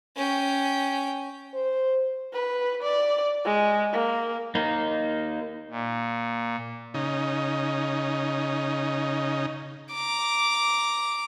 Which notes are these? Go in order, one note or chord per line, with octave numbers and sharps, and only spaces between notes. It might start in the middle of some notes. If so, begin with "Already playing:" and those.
C#4 G5
C5
B4
D5
G#3
A#3
A#3 D#4
A#2
C#3 D#4
A#5 D6